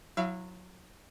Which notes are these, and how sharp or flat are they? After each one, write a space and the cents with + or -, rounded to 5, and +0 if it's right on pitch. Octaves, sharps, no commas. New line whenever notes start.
F#3 -20 E4 +0 F5 -45